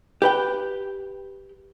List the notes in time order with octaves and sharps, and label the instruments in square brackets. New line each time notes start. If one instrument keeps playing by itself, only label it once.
[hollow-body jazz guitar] G4 B4 G5